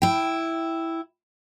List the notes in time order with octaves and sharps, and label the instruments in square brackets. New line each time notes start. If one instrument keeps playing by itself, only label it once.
[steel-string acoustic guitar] E4 G5